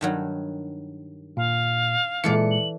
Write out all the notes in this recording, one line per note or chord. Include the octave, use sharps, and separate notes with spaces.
G2 D#3 F#3
A#2 F5
A#2 E3 G#3 A4 D5 C#7
F#7